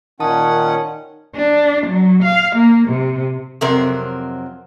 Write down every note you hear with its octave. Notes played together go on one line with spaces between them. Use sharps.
A#2 D#3 C#4 F#5 A5 D#6
D4
F#3
F5
A#3
C3
F2 C3 F#3 C4 A#4